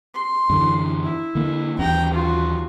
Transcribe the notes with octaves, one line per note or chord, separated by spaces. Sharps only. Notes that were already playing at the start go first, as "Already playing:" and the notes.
C6
F#2 D3 E3
E4
D3 A#3
D#2 E3 C#4 G5 A#5
F4 F#4